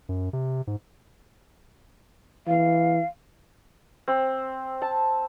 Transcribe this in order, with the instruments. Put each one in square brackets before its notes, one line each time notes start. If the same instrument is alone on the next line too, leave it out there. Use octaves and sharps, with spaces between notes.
[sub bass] F#2
C3
G#2
[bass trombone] E3 [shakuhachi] F5
[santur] C4
A5